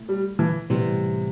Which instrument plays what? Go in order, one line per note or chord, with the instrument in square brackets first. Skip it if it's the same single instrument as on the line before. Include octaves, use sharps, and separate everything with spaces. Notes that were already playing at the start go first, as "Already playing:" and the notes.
Already playing: [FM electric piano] B2 A3 E4
[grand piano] G3
E3
[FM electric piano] A2 E3 G3 B3 [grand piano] C3